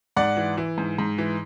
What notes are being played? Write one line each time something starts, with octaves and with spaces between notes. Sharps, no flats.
G#2 D5 F#5
E3
E3
G#2
G#2
E3